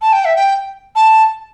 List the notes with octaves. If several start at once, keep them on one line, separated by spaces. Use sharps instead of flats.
A5
G5
E5
G5
A5